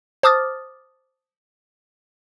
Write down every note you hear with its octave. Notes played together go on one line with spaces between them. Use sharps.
C5 A5 D6 D#6 F6 A6